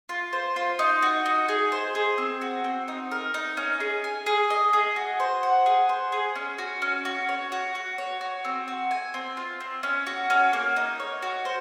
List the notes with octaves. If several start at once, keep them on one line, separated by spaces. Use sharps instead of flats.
F4
C5
F4
D#4
F#4
D#4
G#4
C5
G#4
C4
F#4
C4
D#4
A#4
D#4
C#4
G#4
G#5
G#4
D#5
G#4
F#4
C5
F#5
G#4
C5
G#4
C#4
F#4
C#4
F#4
C#5
F#4
F#4
C#5
F#4
C4
F#4
G#5
C4
F4
C4
C#4
F#4
C#4
A#3
D#4
C#5
F#4
C5